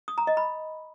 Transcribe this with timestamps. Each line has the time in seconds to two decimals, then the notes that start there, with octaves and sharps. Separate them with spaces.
0.08 D#6
0.18 A#5
0.27 D#5
0.37 B5